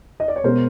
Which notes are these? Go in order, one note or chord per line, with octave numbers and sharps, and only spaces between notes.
D#5
D5
C#5
B2 G#3 B3 A#4 C5